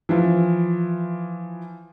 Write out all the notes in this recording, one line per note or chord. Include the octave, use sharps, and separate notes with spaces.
E3 F3